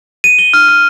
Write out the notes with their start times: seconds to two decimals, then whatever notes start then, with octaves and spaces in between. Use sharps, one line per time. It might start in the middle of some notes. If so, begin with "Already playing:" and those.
0.24 D#7
0.39 G7
0.54 F6
0.68 F6